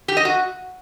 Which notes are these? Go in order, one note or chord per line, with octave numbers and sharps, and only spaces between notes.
G4
D#5
F#4